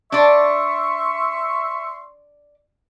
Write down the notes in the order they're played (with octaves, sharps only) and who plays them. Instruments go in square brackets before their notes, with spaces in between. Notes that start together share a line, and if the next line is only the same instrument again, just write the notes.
[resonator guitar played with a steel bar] D4 D5 [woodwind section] E5 C6 C#6